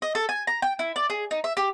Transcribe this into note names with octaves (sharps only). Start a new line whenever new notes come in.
D#5
A4
G#5
A#5
G5
E4
D5
G#4
D#4
E5
G4